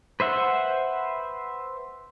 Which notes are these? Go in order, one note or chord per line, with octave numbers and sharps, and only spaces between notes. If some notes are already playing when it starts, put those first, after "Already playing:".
B4 C5 E5 F#5